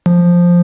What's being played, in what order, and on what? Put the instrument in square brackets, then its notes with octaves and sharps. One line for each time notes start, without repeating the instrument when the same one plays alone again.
[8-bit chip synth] F3